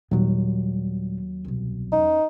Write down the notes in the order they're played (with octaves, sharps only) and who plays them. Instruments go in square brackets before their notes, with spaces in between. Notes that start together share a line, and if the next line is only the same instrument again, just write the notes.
[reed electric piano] D#2 F#3 [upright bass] A#2 G3
[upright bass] C2 B2
[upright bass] E2 C#4 [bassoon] D#4